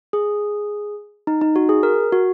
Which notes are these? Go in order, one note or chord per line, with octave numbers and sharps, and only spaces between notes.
G#4
D#4
D#4
F#4
G#4
A#4
F#4